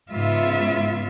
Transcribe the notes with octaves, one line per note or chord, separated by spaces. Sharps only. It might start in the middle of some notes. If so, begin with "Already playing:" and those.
G#2 C#3 B3 F4 E5